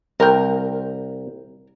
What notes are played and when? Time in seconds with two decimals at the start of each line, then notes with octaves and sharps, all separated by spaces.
0.20 C2 A#4 G5